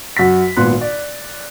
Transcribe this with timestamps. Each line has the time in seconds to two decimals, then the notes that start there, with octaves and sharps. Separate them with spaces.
0.17 F#2 F#4 F#5 B6
0.57 G#1 A#2 B3 C6 F#6
0.81 D5